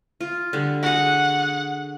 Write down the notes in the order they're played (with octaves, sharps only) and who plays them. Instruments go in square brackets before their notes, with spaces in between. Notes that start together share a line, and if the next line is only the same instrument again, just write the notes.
[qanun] F4
D3 G3
[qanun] F#4 G#4 [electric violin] F#5